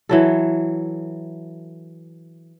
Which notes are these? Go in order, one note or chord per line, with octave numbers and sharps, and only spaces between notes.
E3 F#3 A4